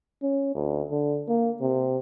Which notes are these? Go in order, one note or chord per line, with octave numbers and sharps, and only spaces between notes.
C#4
D2
D3
A#3
C3